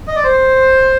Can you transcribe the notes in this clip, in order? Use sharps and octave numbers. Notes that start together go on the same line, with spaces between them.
D#5
D5
C5